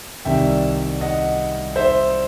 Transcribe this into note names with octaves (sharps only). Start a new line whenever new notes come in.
C2 C3 D#3 G3 E5 G5
D#5 F#5
C5 E5